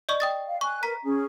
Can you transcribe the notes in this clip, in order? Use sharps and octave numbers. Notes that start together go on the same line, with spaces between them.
D5 D#5 C#6
G5 D#6 A6
F5
G#5 C#6 F#6
A#4 B4 A#5 B6
C#4 G#4